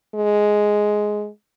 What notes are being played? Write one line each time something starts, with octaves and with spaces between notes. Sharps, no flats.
G#3